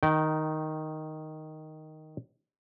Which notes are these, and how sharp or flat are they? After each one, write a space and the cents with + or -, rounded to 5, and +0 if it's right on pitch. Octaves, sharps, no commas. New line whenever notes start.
D#3 +0 G5 -25